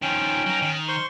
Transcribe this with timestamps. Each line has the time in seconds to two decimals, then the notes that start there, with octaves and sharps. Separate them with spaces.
0.02 D#3 F3 C#4 G5
0.46 F#3 D#4
0.62 D#3
0.88 C5 C6 C#6